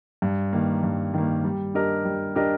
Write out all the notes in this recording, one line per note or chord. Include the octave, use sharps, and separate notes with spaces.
G2
D#3 A#3
G2
D#3 A#3
G3
D4 G4 A#4 D#5
G3
D4 G4 A#4 D#5